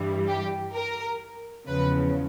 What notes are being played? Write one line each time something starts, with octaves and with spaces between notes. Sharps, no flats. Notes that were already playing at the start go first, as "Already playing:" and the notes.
Already playing: G2 E3 G3
G4
A#4
E2 C#3 F3 B4